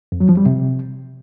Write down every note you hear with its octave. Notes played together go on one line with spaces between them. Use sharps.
F2
F#3
F3
G3
C3